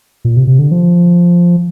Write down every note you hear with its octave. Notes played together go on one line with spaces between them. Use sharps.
A#2
C3
C3
D3
F3